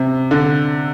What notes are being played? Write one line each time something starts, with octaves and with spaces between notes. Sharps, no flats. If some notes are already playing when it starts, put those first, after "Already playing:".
Already playing: C3
D3